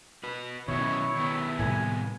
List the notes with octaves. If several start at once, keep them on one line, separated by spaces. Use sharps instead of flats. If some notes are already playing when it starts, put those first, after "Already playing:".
F#4 B4
B2 D#3 F#3 C#4 E4 C#5
D#3 B3
A2 C3 G3 G#5